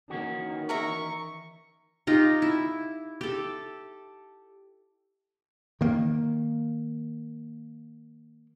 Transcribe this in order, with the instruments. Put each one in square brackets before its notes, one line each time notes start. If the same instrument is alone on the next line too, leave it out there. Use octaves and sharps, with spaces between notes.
[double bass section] D#3 E3 [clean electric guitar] A#3 C#4 F#4
[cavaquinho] A#4 E5 A#5 [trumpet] C#6
[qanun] D#4 F4 G4
E4
G4 A4
[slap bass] D#3 A#3